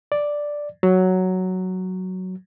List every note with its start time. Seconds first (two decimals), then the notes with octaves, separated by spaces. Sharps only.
0.12 D5
0.83 F#3